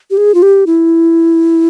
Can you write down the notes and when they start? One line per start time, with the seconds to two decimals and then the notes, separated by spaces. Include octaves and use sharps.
0.10 G4
0.17 G#4
0.34 F4
0.42 G4
0.67 E4